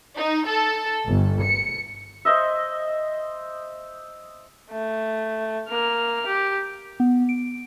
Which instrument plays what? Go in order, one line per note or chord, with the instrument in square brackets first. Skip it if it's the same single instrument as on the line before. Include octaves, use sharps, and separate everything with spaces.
[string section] D#4
A4
G1
C#7
[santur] C5 D#5 E5
[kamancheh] A3
A#3 F6
G4
[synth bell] B3
D7